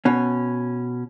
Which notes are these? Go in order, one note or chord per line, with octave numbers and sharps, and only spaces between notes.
B2 C#4